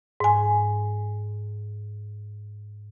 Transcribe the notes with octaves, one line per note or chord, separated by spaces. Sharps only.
G#2 G#5